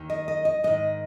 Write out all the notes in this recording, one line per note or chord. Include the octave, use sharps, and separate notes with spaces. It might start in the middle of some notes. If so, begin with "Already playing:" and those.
Already playing: D#2 D#3
D#5
D#5
D#5
G#2 D#3 D#5